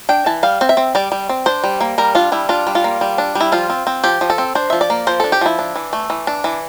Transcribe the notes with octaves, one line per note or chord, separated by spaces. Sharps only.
D4 G5
E3 A5
G3 F5
C4
E5
C4
G3 D5
G3
C4
D4 C5
G3
A#3
G3 A#4
D4 F4
G3 E4
D4 F4
G3
F4
A#3
G3
D4
G3
E4
F3 F4
C4
C4
F3 G4
F3
A4
C4
D4 C5
F3 E5
D5
A#3
F3 C5
D4 A4
G4
F3 E4
D4
E3
A3
E3
D4
E3